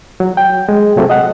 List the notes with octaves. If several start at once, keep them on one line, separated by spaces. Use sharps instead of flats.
F#3
G5
G#3
C3 F#3 A3 C4
D#5 F#5